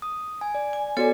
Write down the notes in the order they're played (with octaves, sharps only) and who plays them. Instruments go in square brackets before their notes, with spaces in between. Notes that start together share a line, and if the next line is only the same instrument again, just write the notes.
[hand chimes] D#6
G#5
D5
[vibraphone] G#5
[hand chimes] B3 F#4 D5 [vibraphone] A4 C#5 G#5